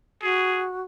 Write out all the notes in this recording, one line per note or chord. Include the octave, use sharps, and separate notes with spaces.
F#4 G#4